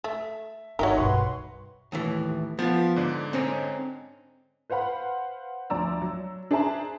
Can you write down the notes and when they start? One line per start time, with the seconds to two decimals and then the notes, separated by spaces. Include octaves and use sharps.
0.04 A3 E5
0.79 G#1 D#4 F#4 G4 A#4 C#5 E5
0.97 B1 G2 B4 F#5 C6 C#6
1.92 D#2 A2 E3
2.59 F3 B3 F4
2.96 G#2 D3 D5
3.33 C4 C#4 D#4
4.70 B4 C5 F5 F#5 B5
5.70 D2 F3 D5 A#5 E6
6.02 F#3
6.51 D4 G#4 C5 E5 A5 A#5